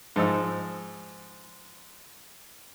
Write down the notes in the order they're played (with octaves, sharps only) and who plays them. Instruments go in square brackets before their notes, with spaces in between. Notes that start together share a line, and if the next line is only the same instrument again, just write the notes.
[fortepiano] G#2 F3 D#4 E6